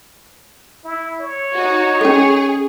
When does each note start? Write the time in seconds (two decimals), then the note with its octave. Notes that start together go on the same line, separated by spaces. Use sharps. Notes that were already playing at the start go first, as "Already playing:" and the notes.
0.85 E4
1.20 C#5
1.55 D#4 F#4
2.01 C#4 G#4 A4